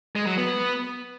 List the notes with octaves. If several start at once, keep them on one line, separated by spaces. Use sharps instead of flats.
G#3
F#3
B3